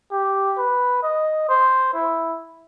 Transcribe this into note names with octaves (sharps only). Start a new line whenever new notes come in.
G4
B4
D#5
C5
E4